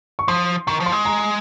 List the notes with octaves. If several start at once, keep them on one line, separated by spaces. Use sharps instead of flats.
C#6
F3 C6
D#3 C#6
F3
C6
G#3
A#5